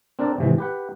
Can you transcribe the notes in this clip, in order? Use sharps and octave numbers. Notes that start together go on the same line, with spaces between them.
C4 D4 A#4 D5
G#1 C3 E3
G4 B4 F#5